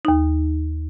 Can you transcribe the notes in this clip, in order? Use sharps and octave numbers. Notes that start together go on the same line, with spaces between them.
D#2 D#4